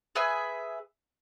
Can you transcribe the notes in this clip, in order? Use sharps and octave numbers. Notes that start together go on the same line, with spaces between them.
G#4 B4 E5 G#5